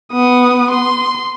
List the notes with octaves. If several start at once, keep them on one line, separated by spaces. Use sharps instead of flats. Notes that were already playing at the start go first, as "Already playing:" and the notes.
B3 D#6
C6